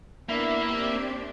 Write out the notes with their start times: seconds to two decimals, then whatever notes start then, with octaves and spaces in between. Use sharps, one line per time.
0.29 A#3 B3 D4 E4 E5
0.70 C4 D4 G4